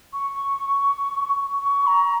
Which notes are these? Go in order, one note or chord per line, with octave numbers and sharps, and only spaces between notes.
C#6
C#6
A#5